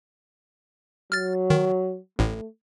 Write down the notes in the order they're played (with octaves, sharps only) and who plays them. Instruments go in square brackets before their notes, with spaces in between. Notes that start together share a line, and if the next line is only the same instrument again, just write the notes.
[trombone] F#3 [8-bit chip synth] F6 A6
[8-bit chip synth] D#3
[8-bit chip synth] A1 A2 [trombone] A3